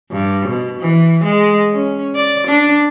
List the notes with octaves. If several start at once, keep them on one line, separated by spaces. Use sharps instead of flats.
G2
B2
E3
G#3
C#4
D5
D4